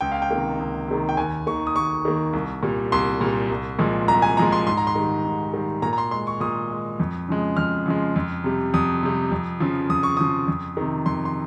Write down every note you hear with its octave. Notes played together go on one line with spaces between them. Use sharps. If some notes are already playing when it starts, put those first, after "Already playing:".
C#2 G5
F5
G5
C3 D#3 A#3
C#2
C3 D#3 A#3
G5
D#2 G#5
D#3 A#3 C#6
D#6
D#2 C#6
D#3 A#3
C2
A#2 G3
C2 C6
A#2 G3
C2
A#2 F3 G#3
C2 A#5
G#5
A#2 F3 G#3 A#5
C6
G#2 C6
A#5
C6
D#3 G3
G#2
D#3 G3
A#2 A#5
A#5
C6
G#3 C6
C#6
A#2 D#6
G#3
F2
C#3 F3 G#3
F2 F6
C#3 F3 G#3
F2
C3 G3
F2 D#6
C3 G3
F2
C#3 F3
F2 D#6
C#6
C#3 F3 D#6
F2
C3 D#3
F2 C6
C6